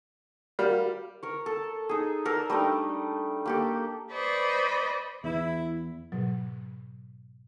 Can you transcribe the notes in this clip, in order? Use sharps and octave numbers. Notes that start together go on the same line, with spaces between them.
G3 F#4 A#4 F5
A#4 C#5
A4
D#4 G#4
A4 A#4 D5 E6
G3 A3 D4 D#4
A#3 G4 A4
B4 C5 D5 D#5 B5 C#6
E2 E4
G#2 B2 F#3